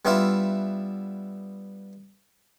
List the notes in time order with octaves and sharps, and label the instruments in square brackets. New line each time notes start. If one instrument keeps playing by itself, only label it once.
[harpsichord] G3 B3 D4 E4 F4 E5